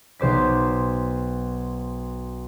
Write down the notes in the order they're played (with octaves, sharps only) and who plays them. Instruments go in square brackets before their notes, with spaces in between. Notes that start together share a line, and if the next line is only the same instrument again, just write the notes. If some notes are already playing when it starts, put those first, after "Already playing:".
[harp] B1 C5 D6 B6